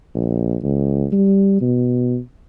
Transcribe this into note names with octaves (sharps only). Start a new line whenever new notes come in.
A#1
C#2
G3
B2